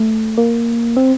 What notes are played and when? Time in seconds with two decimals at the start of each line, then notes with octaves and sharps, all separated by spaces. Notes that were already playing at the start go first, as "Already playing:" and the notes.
Already playing: A3
0.38 A#3
0.97 C4